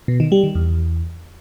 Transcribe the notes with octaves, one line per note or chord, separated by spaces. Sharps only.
B2
D#3
G3
D#3
E2